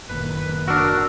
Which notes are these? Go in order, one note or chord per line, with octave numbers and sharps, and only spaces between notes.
F#1 A#2 D#3 B4
D4 F#4 A#4 E6